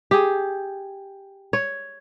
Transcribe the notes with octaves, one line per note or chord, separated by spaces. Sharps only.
G4 G#4
C#5